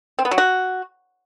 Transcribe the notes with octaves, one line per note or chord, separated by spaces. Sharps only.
C4
B3
F#3
F#4